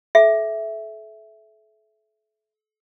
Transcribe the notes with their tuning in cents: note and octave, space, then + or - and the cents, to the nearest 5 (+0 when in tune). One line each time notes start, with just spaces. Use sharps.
A4 -35 E5 +0